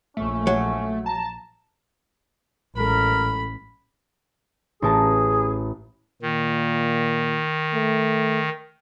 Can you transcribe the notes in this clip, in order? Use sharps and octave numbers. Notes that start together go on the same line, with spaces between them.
A#1 A3 C#4
F#3
A5 A#5
A1 F#3 G#3 A4 A#4 B5
A1 G#4 A#4 A5
A#2 D#3
A3